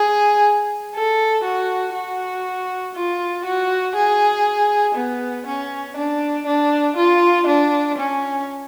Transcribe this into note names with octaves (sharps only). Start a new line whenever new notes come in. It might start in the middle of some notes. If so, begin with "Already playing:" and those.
Already playing: G#4
A4
F#4
F#4
F4
F#4
G#4
B3
C#4
D4
D4
F4
D4
C#4